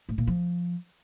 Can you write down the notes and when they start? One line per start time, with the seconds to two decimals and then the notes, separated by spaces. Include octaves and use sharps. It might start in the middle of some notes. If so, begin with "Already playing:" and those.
0.09 A2
0.18 A#2
0.27 F3